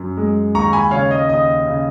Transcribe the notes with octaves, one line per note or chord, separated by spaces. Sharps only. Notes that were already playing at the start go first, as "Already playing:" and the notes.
Already playing: F#2
G#3
D#2 A#5 C#6
G#5 B5
C#3 C#5 F5
D#5
D#2 D#5
C#3